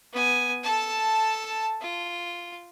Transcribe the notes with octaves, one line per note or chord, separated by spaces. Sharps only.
B3 G#5
A4 A5
F4